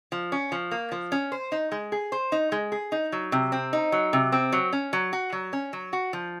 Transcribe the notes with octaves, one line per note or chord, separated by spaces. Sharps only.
F3
C#4
F3
A#3
F3
C#4
C5
D#4
G#3
G#4
C5
D#4
G#3
G#4
D#4
F#3
C3
C4
D#4
F#3
C3
C4
F#3
C#4
F#3
F#4
F#3
C#4
F#3
F#4
F3